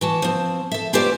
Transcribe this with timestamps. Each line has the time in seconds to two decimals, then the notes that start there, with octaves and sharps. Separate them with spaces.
0.01 E3 F#4 A5
0.22 F3 C4
0.72 A4 E5
0.93 C#4 F4 G4 B4 C5 D5